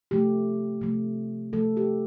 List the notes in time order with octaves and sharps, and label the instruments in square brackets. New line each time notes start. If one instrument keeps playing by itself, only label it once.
[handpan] C3 F3 A3 G4
C3 F3 A3
C3 F3 A3 A4
G4